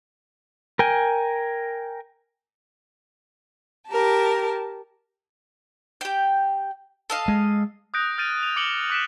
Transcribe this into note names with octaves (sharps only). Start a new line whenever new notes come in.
A#4 G5 G#5
G4 A#4 A5
G4 G5
A4 D#5 F5
G#3
D#6 F#6 G6 A#6 D7
F6 G6 A6 D7 D#7
D#7 F7
D6 G6 C#7 D7 F#7 G7
D6 F#6 B6 C#7 D7 E7